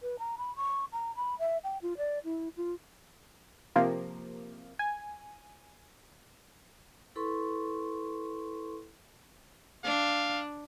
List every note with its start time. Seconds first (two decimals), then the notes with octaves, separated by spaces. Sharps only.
0.01 B4
0.19 A#5
0.38 B5
0.56 C#6
0.92 A#5
1.16 B5
1.39 E5
1.63 G5
1.82 F4
1.97 D5
2.24 E4
2.57 F4
3.76 C3 F3 A#3
4.79 G#5
7.16 E4 A4 B4 C6 C#6
9.84 D4 F5